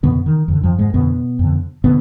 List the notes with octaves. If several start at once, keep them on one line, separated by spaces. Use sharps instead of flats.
F2 B2 D3 B3
D#3
F2 D3 D#3
F2 F3
G#2 G#3
F2 B2 D3 B3
F2 D3
B2 D3 B3